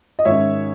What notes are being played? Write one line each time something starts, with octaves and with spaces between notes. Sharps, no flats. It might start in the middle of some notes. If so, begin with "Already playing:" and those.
D#5
G#2 D#3 G#3 C#4 C#5 E5